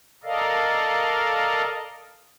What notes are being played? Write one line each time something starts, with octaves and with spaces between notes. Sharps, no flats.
A4 A#4 D5 D#5 F5